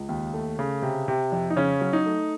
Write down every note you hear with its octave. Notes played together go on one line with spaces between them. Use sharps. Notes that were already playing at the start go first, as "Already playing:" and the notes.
Already playing: C#2
D#2
A3
C#3
C3
C3
F2
D#4
C#3 C#4
F#3
D#4
A3